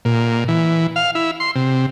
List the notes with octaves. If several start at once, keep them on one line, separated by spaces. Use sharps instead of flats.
A#2
E3
F5
E4
C6
C3